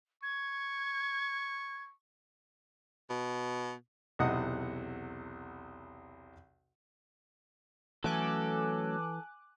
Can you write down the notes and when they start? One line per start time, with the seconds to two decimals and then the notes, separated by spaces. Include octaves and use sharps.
0.23 C#6 G#6
3.10 B2
4.19 B1 E2 C3 D#5 F#5 D#6
8.04 E3 F#3 A3 C#4 A4 G#5 D6 F#6